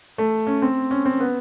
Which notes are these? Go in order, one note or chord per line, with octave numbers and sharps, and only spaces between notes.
A3
C#4
C4
C#4
C4
B3